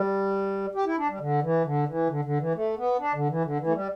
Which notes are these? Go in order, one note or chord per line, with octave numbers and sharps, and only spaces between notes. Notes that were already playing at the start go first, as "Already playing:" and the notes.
Already playing: G3
G4
E4
D4
G3
D3
E3
D3
E3
D3
D3
E3
A3
B3
D4
D3
E3
D3
E3
A3
G3